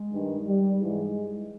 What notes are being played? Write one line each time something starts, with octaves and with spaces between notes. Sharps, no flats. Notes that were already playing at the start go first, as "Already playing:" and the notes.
Already playing: G#3
G2 D#3
G3
G#2 E3 G#3